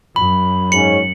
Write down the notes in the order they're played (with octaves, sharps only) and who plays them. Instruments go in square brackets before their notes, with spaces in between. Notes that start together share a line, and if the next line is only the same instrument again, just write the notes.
[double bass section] F#2 [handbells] B5
[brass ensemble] G#2 C#4 [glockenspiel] C#7 F#7